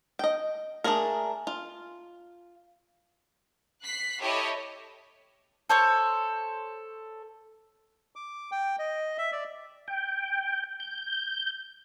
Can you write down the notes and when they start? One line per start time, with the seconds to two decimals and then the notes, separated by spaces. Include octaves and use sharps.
0.19 D#5 G5
0.84 A3 D4 E4 G#4 A#4
1.47 F4
3.82 F#6 B6 C7
4.21 E4 G4 A4 C#5 D#5
5.69 A4 C5 C#5
8.16 D6
8.52 G5
8.79 D#5
9.18 E5
9.32 D5
9.88 G5
10.80 G6